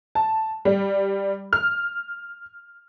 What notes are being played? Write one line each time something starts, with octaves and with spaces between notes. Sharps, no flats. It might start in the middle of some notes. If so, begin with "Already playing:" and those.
A5
G3
F6